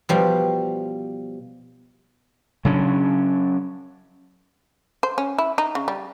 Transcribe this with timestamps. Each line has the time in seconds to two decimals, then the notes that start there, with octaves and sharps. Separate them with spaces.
0.09 B2 F3 G3
2.65 C#3 F#3 C#4 D4
5.03 C5
5.18 C#4
5.38 E4
5.58 D#4
5.75 C#3
5.88 G3